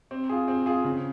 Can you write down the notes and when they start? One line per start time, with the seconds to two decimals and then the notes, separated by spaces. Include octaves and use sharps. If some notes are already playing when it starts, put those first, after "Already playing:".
0.11 C4
0.29 F4 G#4
0.48 C4
0.66 F4 G#4
0.84 C#3